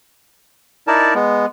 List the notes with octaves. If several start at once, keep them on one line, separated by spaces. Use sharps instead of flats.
D#4 E4 A#4 D5 A5
G#3 B3